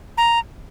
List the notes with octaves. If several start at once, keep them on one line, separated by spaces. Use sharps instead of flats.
A#5